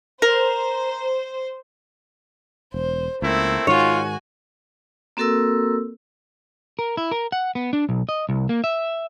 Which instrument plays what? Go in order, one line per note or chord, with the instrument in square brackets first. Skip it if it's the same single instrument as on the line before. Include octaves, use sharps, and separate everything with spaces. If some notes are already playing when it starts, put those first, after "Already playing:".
[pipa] A#4 [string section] C5
[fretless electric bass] E1 [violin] C5
[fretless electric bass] C#2 [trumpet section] A3 C4 E4 [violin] A#3
[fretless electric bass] G#2 D#3 [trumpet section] F4 [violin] F#4 G#5 [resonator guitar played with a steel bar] C#5
[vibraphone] A#3 C4 F#4 A4 A#4 E6
[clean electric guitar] A#4
E4
A#4
F#5
B3
D4
B1
D#5
C2
A#3
E5